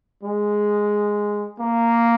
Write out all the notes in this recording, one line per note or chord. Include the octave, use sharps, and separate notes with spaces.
G#3
A#3